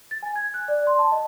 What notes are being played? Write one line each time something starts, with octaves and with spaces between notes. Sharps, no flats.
A6
G#5
G#6
F#6
D5
C6
A5
D#5